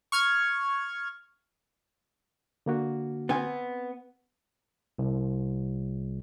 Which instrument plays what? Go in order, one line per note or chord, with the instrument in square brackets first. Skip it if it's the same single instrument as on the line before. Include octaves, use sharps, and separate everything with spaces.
[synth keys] C#6 F6 G#6
[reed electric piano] D3 A#3 F#4
[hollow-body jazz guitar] B3 C4 G#5
[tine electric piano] C2